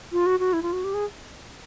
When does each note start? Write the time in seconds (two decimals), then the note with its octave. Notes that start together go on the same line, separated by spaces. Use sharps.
0.12 F4
0.26 F#4
0.40 F#4
0.53 E4
0.63 F4
0.73 F#4
0.84 G4
0.94 G#4